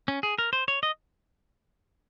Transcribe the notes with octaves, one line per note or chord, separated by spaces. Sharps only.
C#4
G#4
A#4
C5
C#5
D#5